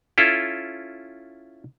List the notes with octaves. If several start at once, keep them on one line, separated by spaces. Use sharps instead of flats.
C#4 E4 F4 A4